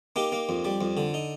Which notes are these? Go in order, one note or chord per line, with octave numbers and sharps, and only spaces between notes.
A#3 D#4 G4
A#3
F2
G3
F2
D3
D#4